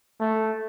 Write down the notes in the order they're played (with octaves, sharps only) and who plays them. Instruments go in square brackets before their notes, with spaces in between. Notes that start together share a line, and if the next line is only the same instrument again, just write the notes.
[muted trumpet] A3